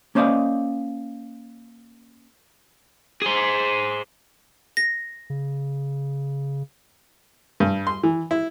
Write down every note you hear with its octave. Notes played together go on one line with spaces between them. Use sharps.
A#3 C#4 C5 D5 D#5 F5
G#4 C5
A#6
C#3
G2
C6
E3
E4